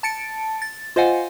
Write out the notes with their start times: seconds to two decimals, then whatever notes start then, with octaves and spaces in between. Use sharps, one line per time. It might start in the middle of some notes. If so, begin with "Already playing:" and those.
0.03 A5 A6 C#7 D7
0.62 A6
0.96 F4 C5 D#5 F5 F#5 G#5